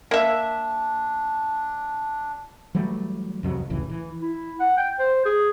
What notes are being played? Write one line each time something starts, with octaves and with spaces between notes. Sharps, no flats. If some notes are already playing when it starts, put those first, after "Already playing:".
A#3 D4 E5
E3 F#3 G3 A3
C2 F2 F#3
F1 C#2 A2 E3
E3
E4
F#5
G5
C5
G#4